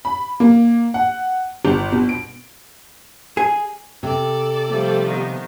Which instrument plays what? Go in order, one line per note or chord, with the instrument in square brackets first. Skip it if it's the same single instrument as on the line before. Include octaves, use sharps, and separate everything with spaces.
[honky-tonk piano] B5
A#3
F#5
G1
B2
D7
[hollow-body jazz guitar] G#4
[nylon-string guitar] C3 [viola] A4 D5
[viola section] F3 G3 A3
[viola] D#3 B3